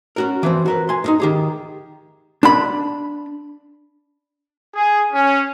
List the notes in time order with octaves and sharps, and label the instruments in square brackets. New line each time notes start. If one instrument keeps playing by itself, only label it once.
[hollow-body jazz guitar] C#4 F#4 A#4
E3 F3 C4
F#4 A#4 B4
G#5 C6
A2 D#4
D#3 G4 G#4
D4 B5
[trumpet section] G#4
C#4